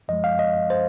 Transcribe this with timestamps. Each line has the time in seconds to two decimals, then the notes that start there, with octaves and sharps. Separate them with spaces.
0.08 F#2 F3 G#3 D#5
0.24 F5
0.39 D#5
0.70 C5